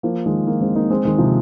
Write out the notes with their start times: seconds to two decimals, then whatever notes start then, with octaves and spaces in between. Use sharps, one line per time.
0.03 F3 A#3
0.26 D#3 G#3
0.47 F3 A#3
0.61 G#3 C4
0.75 A#3 D#4
0.90 G#3 C4
1.05 D#3 G#3
1.18 C3 F3